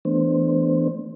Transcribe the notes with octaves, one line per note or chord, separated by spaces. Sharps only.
E3 A3 B3 D4 C5